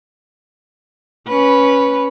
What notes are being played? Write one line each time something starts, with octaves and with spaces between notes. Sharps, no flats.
C#4 B4